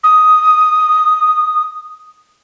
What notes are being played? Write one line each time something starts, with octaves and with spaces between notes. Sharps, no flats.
D#6